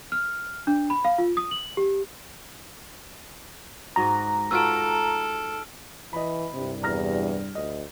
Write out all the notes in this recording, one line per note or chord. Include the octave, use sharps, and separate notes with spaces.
F6
D4
B5
F5
F4
D#6
F#7
G4
G#2 F#4 D#5 A#5
F4 F#4 A4 B4 E6 F6 D7
E3 D#5 B5
C2 G2 C3 G3
E2 A#5 F6 A#6
D2 D#5